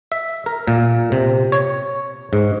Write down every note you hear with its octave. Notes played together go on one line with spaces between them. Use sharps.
E5
A#4
A#2
C3
C#5
G#2